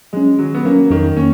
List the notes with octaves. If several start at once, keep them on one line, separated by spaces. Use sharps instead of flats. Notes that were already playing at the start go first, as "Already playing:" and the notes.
F#3 G#3 C#4
D#3 F#3
B3
F#3 A#3 C#4
F2 D#3
D#3 A#3 C#4